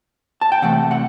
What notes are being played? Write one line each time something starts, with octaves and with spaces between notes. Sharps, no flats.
A5
G5
C3 E3 A3 F#5
F#5